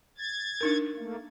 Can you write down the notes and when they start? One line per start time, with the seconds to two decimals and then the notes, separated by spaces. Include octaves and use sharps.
0.18 G#6 A6
0.61 D4 D#4 A#4
0.96 A3 A#3